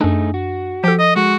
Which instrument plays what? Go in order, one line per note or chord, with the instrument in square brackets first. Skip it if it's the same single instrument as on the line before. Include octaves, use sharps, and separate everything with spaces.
[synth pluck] F#2 D4 [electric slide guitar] A3 D#4 G#4
[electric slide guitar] F#4
[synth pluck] F3 A4 [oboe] G4
[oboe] D#5
[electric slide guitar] G#3 [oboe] F#4